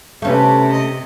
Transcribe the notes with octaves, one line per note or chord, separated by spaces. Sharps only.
C3 A3 C#4 G4 B4
D#5